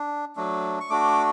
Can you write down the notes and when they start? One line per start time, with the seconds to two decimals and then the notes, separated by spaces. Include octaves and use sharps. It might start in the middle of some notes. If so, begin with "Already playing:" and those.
Already playing: D4
0.36 F#3 A3 D4
0.80 C#6
0.90 A3 D4 F#4 D6